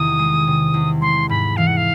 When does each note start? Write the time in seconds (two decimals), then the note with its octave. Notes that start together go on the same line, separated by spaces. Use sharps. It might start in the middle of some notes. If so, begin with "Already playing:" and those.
Already playing: E2 C3 D#3 D#6
0.19 G#3
0.47 C3
0.74 E2
1.01 G#3 C6
1.29 G#2 B5
1.57 E3 F5
1.67 F#5
1.77 F5